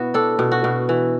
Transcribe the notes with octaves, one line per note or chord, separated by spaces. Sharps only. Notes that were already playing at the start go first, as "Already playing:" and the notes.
Already playing: B2 B3 E4 F#4
D4 A4
B2
F#4
B2
E3